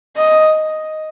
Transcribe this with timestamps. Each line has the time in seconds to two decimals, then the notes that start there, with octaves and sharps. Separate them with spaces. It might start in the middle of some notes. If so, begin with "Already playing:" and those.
0.17 D#5